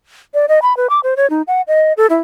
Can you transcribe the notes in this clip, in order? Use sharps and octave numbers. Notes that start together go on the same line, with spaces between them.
D5
D#5
B5
B4
D6
C5
C#5
D#4
F#5
D#5
A4
E4